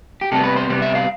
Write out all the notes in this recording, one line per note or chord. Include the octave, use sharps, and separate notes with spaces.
G4
C3 G3 B3 A4
B4
C5
C3 G3 B3
E5
F5